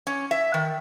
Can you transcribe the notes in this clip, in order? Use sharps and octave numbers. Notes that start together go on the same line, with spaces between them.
C#4
E5
D#3